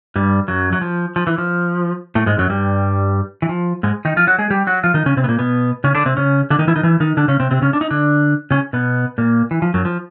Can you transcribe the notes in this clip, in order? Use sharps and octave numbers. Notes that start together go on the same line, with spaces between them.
G2 G3
F#2 F#3
F#3
F3
F3
E3
F3
A2 A3
G#2 G#3
F#2 F#3
G2 G3
E3
F3
G#2 G#3
D#3 D#4
F3 F4
F#3 F#4
G#3 G#4
G3 G4
F#3 F#4
F3 F4
D#3 D#4
C#3 C#4
C3 C4
B3
A#2 A#3
B2 B3
C#3 C#4
D3 D4
C3 C4
C#3 C#4
D3 D4
D#3 D#4
E3 E4
D#3 D#4
E3 E4
D#3 D#4
D3 D4
C#3 C#4
C3 C4
C3 C4
C#3 C#4
D4
D#4
D3 D4
C#3 C#4
B2 B3
A#2 A#3
E3
F3
F#2 F#3
F3